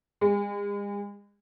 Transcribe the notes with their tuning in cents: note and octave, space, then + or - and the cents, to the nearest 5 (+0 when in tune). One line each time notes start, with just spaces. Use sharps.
G#3 -40